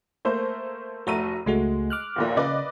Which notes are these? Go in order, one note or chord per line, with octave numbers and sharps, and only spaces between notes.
A3 A#3 C5
F1 A3 F#4 A#5 D#7
C#2 G#3 A3 F#4
D6 F6 F#6
A#1 D#2 A#2
C#3 B4 D5 D#5